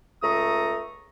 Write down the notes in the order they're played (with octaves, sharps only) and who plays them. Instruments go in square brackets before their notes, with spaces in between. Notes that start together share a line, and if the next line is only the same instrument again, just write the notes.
[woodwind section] C#2 A3 A#5 C#6 D#6